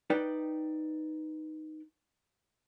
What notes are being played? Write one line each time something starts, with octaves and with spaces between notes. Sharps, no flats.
D#4 B4 D5 G5